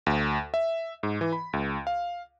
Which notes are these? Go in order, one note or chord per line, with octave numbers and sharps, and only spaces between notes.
D2
E5
G#2
E3
B5
C#2
F5